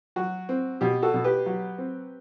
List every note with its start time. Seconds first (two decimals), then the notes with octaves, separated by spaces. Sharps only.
0.16 F#3 F#4
0.49 C4
0.81 B2 G4
1.02 F#4 A4
1.14 B2
1.24 G4 B4
1.46 F#3
1.78 C4